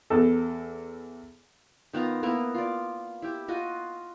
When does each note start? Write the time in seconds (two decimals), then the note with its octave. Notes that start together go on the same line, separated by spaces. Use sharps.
0.10 E2 A4
1.93 D#3 B3 F4 A#5
2.23 A#3 B3 E4 A#4
2.55 F4 D5
3.22 E4 G4
3.48 F4 F#4 D#5